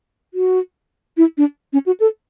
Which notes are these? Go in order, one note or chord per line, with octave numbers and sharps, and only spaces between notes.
F#4
E4
D4
C#4
F#4
A4